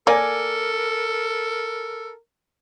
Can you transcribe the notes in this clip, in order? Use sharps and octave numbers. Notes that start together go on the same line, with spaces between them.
A#3 A4 A#4 D5 G#5